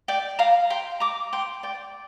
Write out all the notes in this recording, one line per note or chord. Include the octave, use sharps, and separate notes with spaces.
D5 G5
F5 A#5
G5 C6
A#5 D6
G5 C6
D5 G5